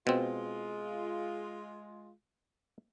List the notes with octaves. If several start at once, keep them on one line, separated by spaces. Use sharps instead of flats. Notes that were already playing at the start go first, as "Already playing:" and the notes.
B2 G#3 C4 F4